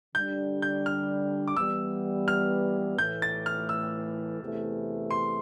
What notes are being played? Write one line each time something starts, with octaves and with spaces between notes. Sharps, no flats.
D3 G3 D4 G6
G6
F6
D6
E3 G3 B3 E6
F6
A2 E3 A3 G6
A6
F6
E6
E2 C3 E3 A3
C6